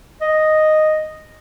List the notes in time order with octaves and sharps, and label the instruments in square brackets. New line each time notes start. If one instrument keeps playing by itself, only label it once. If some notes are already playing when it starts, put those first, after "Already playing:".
[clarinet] D#5